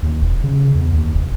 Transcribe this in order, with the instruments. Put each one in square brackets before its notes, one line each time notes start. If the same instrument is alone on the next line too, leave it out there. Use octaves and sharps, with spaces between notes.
[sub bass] D#2
E1
C#3
E2
D#2
F1